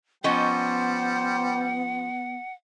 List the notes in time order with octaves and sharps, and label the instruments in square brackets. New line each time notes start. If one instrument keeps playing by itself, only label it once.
[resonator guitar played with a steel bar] F3 C#4 D#5 [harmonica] G3 C5 G5 [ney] B3 [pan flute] F#5